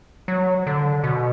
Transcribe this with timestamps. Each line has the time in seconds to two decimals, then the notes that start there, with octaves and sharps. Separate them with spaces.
0.28 F#3
0.67 D3
1.04 B2